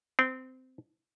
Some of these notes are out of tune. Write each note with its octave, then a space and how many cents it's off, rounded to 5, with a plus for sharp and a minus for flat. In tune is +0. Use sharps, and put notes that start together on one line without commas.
C4 -20